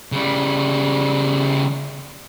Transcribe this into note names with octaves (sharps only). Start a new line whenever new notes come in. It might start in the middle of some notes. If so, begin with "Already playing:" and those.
C#3 G3